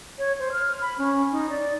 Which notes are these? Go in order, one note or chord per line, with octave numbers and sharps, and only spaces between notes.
C#5
C5
F6
B5
C#4
D#4
D5